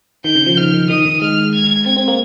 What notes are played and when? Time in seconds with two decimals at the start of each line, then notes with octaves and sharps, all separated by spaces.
0.24 D#3 G6
0.35 C#3
0.46 F3
0.57 D#3 F6
0.74 D#3
0.90 D#3 D#6
1.05 D#3
1.21 G#3 F6
1.54 G#6
1.86 C4 G#6
1.97 C4
2.08 A#3